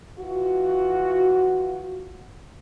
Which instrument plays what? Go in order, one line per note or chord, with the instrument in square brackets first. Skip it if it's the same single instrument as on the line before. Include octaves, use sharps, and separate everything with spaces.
[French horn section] E3 F4 F#4